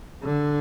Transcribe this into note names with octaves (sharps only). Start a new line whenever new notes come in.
D3